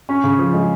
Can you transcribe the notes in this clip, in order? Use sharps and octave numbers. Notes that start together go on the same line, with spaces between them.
C#4
C#3
F3
G#3